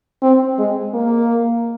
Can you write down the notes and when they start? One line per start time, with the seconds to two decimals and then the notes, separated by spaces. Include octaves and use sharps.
0.22 C4
0.58 G#3
0.94 A#3